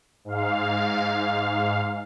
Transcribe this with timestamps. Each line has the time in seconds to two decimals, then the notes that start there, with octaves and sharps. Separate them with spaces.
0.24 G#2 F5